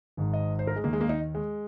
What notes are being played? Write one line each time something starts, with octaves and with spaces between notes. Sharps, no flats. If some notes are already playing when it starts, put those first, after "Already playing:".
G#1 G#2 D#3
D#5
C5
A#4
G#3
D#2 D#3 A#3
G#3
A#3
D#4
G#3